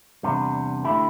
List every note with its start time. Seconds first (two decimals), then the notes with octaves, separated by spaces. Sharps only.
0.23 E2 C3 G3 B3 D4
0.85 D3 A3 E4 G4